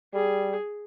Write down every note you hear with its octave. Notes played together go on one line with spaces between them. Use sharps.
G3 G#4